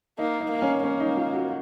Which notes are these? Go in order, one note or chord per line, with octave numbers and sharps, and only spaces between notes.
A#3 D#4
D#4
A#3
C#4
A#3 C#4
D#4
F4
F#4